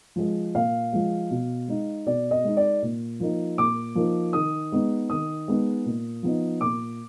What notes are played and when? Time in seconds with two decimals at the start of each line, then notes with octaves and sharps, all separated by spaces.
0.16 F3 G#3
0.55 A#2 F5
0.93 F3 G#3
1.31 B2
1.68 G#3 D#4
2.06 B2 D5
2.31 D#5
2.44 G#3 D#4
2.57 D5
2.82 A#2
3.20 F3 A#3 D#4
3.58 A#2 D6
3.95 F3 A#3 D#4
4.33 D#3 D#6
4.72 G#3 B3 D#4
5.10 D#3 D#6
5.48 G#3 B3 D#4
5.86 A#2
6.23 F3 B3 D#4
6.61 A#2 D6